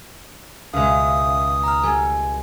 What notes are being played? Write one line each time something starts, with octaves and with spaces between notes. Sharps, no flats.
C#2 B2 G#3 E5 F5 D#6
A#5 F6
G3 A4 G#5